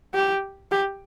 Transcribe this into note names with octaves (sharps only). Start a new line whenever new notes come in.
G4
G4